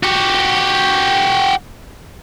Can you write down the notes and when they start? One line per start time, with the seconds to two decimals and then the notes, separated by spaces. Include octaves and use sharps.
0.03 F#4 G4